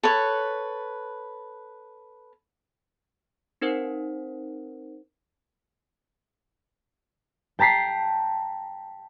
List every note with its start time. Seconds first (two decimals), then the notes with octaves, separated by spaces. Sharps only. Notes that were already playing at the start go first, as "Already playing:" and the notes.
0.03 A4 B4 C#5
3.61 C4 D#4 A#4 C5 F#5
7.59 G5 A5 A#5 B6 C7